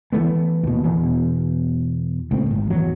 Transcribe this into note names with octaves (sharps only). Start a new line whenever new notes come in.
E3 F#3 A3 B3
D#2 B2
E2 B2
C#2 A2 C4
G#1
A1 E2 F#3